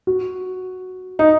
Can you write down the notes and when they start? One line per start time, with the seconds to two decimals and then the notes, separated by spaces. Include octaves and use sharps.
0.07 F#4
1.19 D#4